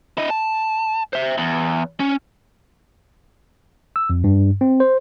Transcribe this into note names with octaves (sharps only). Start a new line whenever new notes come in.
E4 D#5
A5
C5 E5
E2
C#4
E6
F2
G2
C4
C5